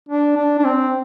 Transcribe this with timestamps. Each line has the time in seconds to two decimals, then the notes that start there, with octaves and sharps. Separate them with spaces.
0.09 D4
0.37 D4
0.59 D4
0.64 C4